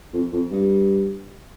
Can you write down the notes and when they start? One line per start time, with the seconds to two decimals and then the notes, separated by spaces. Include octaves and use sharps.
0.13 F2
0.32 F2
0.51 G2